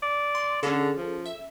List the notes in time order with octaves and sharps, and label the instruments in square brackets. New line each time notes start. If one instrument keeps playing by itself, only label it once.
[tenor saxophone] D5
[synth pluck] C6
[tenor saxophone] D3 [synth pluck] C#4 G#4 A4
[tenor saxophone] F3
[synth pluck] E5